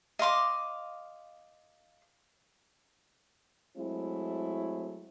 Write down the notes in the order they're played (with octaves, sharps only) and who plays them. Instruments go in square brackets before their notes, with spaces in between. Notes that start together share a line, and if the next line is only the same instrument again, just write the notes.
[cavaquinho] D#5 F5 C6 D6
[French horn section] F#3 G#3 A3 C4 E4